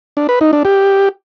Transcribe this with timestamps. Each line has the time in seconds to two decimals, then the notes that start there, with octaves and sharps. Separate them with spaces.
0.17 D4
0.29 B4
0.41 D#4
0.53 D4
0.65 G4